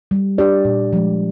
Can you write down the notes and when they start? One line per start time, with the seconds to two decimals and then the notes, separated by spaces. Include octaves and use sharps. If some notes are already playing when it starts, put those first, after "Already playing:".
0.11 G3
0.38 D4 G4 D5
0.65 A#2
0.93 F3 G#3